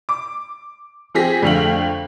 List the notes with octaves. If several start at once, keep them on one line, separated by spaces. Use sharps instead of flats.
D6
F3 C4 G4 G#4 A#6 B6
F2 D3 A3 F5 G5 F#7